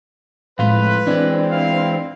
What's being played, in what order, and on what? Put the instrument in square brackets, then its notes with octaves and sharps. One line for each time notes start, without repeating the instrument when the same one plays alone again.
[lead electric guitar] F2 F4 [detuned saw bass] A2 [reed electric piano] G#3 F5 [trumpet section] B4
[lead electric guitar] E3 G#3 [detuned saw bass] C4 [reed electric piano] D4 D5
[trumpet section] E4 F4 F5